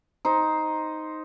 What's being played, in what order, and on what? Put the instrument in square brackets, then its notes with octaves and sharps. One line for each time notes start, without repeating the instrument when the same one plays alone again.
[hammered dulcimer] D#4 C5